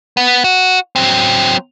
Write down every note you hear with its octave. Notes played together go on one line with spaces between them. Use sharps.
B3
F#4
F#3 C4